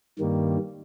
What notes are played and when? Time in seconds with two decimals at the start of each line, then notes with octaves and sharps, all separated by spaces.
0.19 G2 D#3 G3 A#3